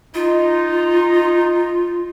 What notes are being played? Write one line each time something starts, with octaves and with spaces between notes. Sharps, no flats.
D#4 F4